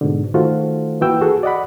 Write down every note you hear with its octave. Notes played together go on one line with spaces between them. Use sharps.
G#2 B2 D3
D#3 A3 F4 F#4 A4 C5
E3 A#3 F#4 B4 G5 E6
F#4 G#4 A4 F#5
D5 D#5 F#5 B5